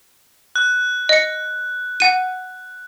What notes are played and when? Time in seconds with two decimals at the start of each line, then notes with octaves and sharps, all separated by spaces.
0.56 F#6
1.09 D#5 C#7
2.00 F#5 D#7